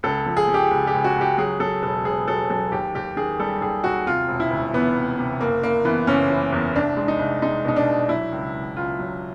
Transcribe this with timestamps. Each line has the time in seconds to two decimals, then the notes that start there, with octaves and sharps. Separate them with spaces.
0.03 C#2 A4
0.26 F3
0.37 G#4
0.48 F3
0.54 G4
0.71 C#2
0.87 G4
0.94 C#2
1.04 F#4
1.16 C#2 G4
1.38 F#3 G#4
1.60 F#3 A4
1.83 E1 A4
2.05 E1 G#4
2.28 F#3 A4
2.50 F#3 A4
2.72 D#2 G4
2.95 D#2 G4
3.16 D#3 G#4
3.40 G3 A4
3.61 D#2 G#4
3.84 D#2 F#4
4.06 C3 F4
4.28 E1
4.40 E4
4.51 D2
4.73 E3 B3
4.97 C3
5.19 C3
5.41 F#1 A#3
5.63 F#1 A#3
5.85 E3 B3
6.07 F#1 C#4
6.30 E3
6.53 E2
6.76 C2 D4
6.97 G#3
7.08 D#4
7.19 C2
7.42 G#3 D#4
7.65 B2 D#4
7.76 D4
7.87 C2
8.09 F#3 E4
8.32 C#2
8.54 C#2
8.77 C#2 F4
8.99 F#3